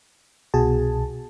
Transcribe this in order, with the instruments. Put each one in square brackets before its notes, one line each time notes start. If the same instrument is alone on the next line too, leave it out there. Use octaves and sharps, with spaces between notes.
[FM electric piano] C2 B2 F#4 G#4 G#5 A5